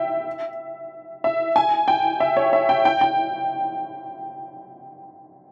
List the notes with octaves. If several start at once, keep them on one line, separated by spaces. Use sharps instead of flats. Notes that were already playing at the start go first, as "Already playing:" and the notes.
Already playing: E5 G5
E5
G#5
G5
E5
C#5
E5
G5
G5
G5